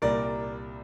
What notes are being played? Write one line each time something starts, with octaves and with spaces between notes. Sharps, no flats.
C2 A#2 G3 A#4 D5